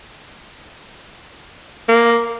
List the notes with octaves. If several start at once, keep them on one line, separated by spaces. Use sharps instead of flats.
A#3